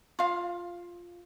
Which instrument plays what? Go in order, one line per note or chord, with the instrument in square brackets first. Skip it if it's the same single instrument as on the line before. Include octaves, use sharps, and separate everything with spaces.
[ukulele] F4 F5